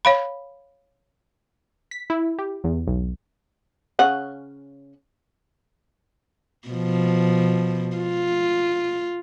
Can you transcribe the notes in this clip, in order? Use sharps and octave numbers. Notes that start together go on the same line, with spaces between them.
C#5 F5 B5
B6
E4
G4
E2
B1
C#3 C#4 F#5
B2 F3
F4